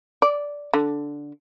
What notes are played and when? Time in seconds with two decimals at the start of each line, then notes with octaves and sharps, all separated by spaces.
0.22 D5
0.73 D3